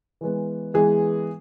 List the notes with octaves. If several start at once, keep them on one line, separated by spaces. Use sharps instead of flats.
E3 G#3 B3
E3 G#3 B3 G#4